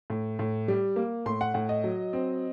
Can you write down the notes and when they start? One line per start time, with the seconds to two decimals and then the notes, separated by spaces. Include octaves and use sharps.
0.10 A2
0.39 A2
0.68 G3
0.96 A#3
1.26 A2 C6
1.41 F#5
1.54 A2 F#5
1.69 D#5
1.84 F#3
2.13 C4